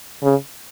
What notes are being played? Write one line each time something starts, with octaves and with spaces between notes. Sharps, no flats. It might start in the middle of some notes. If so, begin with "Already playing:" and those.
C#3